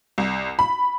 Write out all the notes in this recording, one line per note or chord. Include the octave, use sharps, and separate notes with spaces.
C2
B5